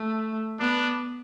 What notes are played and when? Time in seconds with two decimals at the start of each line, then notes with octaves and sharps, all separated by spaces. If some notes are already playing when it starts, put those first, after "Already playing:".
Already playing: A3
0.60 B3 D4